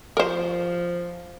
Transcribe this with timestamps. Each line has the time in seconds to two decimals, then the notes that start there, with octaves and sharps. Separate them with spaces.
0.17 F3 A#4 C5